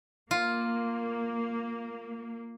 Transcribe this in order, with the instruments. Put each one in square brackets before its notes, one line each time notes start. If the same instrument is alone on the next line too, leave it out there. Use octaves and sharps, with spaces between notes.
[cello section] A#3 [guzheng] F4